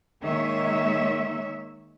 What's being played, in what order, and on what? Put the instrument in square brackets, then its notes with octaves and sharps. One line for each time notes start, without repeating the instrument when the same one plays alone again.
[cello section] D#3 G#3 A#3 C#5 E5